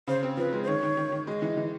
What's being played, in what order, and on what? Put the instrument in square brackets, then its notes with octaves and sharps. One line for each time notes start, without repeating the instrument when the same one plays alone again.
[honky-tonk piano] C#3 [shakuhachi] C5
[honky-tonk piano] C4
[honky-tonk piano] F3 [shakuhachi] B4
[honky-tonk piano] G#3
[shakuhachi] C5
[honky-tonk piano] D#3 [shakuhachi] C#5
[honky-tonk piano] D#3
D#3
D#3
[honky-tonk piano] G#3 [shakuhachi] D#5
[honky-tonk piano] E3
E3